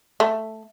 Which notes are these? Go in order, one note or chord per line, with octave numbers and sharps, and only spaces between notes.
A3